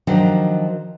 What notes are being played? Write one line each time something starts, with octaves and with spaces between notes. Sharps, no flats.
D#3 F3 F#3 D4 F#5